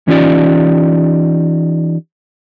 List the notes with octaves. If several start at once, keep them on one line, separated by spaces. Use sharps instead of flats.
E3 C#4 D#4 F4 G4 D5